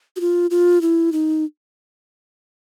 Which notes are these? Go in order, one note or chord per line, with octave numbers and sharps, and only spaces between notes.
F#4
F4
F4
E4
D#4